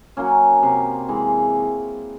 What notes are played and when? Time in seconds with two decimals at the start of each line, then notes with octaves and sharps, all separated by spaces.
0.17 F#3 A#3 C#4
0.63 C3
1.08 E3 G#3